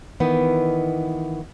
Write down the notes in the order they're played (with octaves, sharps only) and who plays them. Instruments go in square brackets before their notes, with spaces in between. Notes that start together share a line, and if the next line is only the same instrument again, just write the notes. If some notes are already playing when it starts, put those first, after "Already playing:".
[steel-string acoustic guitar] D#3 E3 B3